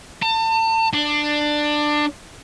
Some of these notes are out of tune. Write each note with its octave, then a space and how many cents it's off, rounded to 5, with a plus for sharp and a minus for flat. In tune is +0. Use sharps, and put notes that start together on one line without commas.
A5 +35
D4 +15